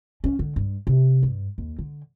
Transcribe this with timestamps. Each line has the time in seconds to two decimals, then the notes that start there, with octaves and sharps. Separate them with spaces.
0.24 C#4
0.39 D3
0.56 G2
0.87 C3
1.23 G2
1.58 D#2
1.79 D3